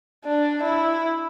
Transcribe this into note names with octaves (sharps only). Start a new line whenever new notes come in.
D4
E4